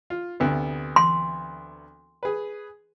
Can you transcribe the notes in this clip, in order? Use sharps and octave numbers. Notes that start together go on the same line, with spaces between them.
F4
D2 C3 B3
C6
G#4 B4